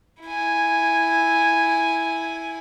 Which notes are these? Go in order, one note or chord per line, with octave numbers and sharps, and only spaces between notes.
E4 G#5